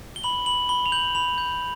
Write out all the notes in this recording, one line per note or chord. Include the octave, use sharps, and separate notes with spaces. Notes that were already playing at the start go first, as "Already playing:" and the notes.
G7
B5 F#7
B5 F#7
B5 G7
F7
G6 F#7
B5 F7
G6